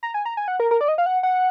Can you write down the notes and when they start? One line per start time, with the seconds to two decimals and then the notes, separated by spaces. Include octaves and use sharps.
0.03 A#5
0.14 G#5
0.25 A#5
0.37 G#5
0.48 F#5
0.60 A#4
0.71 A#4
0.81 D5
0.88 D#5
0.98 F5
1.06 F#5
1.23 F#5